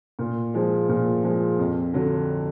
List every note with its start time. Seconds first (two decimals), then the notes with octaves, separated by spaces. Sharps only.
0.19 A#2
0.54 F3 G#3
0.89 A#2
1.24 F3 G#3
1.59 F2
1.94 D3 F#3